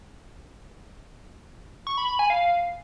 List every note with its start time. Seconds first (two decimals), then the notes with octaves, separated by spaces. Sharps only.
1.87 C#6
1.98 B5
2.08 B5
2.19 G#5
2.30 F5